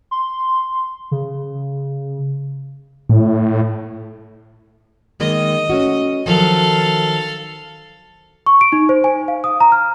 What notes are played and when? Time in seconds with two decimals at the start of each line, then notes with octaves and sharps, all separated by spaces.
0.11 C6
1.11 C#3
3.09 A2
5.20 D#3 G#3 A#3 D#5
5.70 A3 C#4 F#4
6.26 D#3 F3 F#3 A4 F5
8.46 C#6
8.61 D7
8.72 D#4
8.89 C5
9.04 G#5
9.28 F5
9.44 D#6
9.60 A#5
9.72 F6